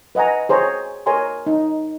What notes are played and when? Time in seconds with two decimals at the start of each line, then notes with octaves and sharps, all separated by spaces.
0.15 B4 D#5 F#5 G#5 A#5
0.49 G#4 C5 C#5 A#5
1.06 A#4 C#5 G#5 A#5 C6
1.46 D#4